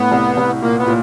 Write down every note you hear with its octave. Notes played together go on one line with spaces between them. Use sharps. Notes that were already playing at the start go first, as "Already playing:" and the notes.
Already playing: A2 B3
C2
C2
A#2 A#3
B3
A#2